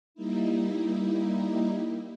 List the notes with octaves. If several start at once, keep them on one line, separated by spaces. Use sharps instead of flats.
G3 A#3 D#4 E4